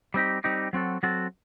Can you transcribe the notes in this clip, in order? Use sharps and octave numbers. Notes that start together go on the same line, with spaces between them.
G3 C4 D#4 G4
G3 C4 D#4 G4
F#3 C4 F#4 A4
F#3 C4 F#4 A4